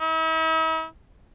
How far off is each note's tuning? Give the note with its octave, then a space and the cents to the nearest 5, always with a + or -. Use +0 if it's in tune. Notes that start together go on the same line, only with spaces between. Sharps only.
E4 -45